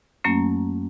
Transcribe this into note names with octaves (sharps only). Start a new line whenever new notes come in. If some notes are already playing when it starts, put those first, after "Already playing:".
F#2 F#3 A3 A#3 C#4